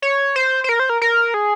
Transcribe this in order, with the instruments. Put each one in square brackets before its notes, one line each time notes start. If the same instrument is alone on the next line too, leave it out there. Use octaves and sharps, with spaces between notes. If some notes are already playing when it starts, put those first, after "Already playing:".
[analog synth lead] C#5
C5
C5
A#4
C5
A#4
A#4
G#4